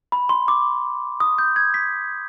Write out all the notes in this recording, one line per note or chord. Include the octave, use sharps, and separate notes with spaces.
B5
C6
D6
D#6
G6
G#6
B6